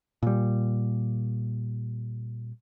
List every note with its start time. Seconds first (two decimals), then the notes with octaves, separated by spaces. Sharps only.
0.23 A#2 G3